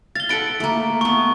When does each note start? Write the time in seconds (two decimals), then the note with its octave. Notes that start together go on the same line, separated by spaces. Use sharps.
0.16 F5 A6 G7
0.29 A4 F#5 B5 A6 D7
0.60 A3 A#3
1.01 A3 B3 C#6